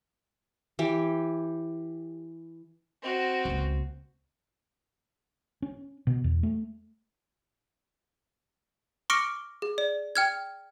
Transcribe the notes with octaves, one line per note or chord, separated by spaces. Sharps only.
E3 G4 G5
C4 F#4
C#2 A#3
C#4
B2
E2
A3
C#6 D6 F6 A#6 C#7 D7
G#4
D5
G5 F6 G#6